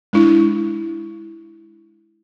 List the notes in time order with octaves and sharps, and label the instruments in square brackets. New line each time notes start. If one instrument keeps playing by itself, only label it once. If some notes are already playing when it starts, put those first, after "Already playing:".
[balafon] G#3 D4 E4